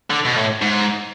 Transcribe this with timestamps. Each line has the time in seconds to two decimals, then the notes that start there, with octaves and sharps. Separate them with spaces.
0.11 D3
0.25 B2
0.36 A2
0.62 G#2